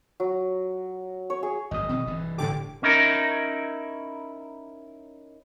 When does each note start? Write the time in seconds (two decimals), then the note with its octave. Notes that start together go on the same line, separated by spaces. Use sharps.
0.20 F#3
1.30 C#5
1.43 G#4
1.71 G#1 F#2 A#2 D#5 D#6
1.89 B2 D#3 E3 C4
2.06 F1 G2 E3
2.38 A2 D3 G4 A4 G5 D6
2.83 C#4 D#4 E4 A#4